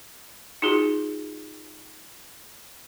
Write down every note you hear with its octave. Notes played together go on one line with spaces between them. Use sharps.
D#4 F4 F#4 G#4